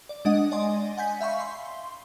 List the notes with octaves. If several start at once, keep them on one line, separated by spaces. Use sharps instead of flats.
D5
G#3 D4 D#5 F#5 D#6
D5 D#5 G#5 C6
F#5 G#5 G6 B6
E5 F5 B5 C#6
C6